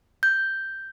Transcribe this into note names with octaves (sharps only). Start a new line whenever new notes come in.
G6